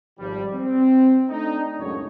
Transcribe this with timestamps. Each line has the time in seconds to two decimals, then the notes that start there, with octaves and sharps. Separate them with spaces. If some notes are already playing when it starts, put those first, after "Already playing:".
0.19 G#1 F3 G3
0.54 C4
1.29 A3 D4 D#4
1.79 C#2 F#2 A2 C#5